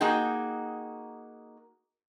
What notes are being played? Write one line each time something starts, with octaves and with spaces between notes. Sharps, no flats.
A#3 D#4 F#4 G#4 G5